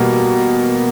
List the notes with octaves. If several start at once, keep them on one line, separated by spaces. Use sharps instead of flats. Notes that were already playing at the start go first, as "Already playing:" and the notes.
Already playing: B2 G3 A#3